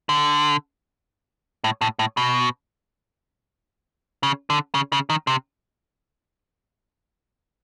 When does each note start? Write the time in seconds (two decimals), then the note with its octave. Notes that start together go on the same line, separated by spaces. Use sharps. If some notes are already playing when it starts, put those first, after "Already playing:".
0.09 D3
1.64 A2
1.81 A2
1.99 A2
2.17 B2
4.23 C#3
4.50 D3
4.75 C#3
4.93 C#3
5.10 D#3
5.27 C3